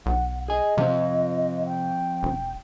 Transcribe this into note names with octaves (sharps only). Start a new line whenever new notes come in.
B1 F#5
G#4 D#5 G#5
C3 F3 C4
G5
E1